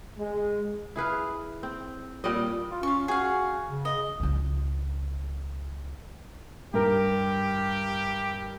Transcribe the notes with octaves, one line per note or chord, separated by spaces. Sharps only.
G#3
E4 G#4 B4 F5
C4
A#2 G3 D5 D#5
F4
C#4 F4 C#6
F#4 G#4 F5
C#3
D#5
C#2 F4
G2 G4 A#4